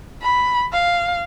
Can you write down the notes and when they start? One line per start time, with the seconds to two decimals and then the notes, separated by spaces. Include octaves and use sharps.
0.22 B5
0.73 F5